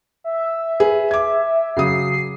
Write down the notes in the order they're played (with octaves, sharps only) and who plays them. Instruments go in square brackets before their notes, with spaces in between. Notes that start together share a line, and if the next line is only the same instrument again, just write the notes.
[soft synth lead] E5
[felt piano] G#4 B4
D6 G#6
[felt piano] C#3 F#3 D#6 [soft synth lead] C7